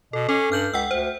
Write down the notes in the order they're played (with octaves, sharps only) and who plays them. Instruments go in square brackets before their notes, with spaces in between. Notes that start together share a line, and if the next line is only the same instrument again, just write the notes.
[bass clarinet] B2 [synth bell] A4
[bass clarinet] C#4 [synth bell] A4
[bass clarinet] G2 [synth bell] F6 G6 F#7
[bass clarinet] C#2 [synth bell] F#5 G5 E6
[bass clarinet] D2 [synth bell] C5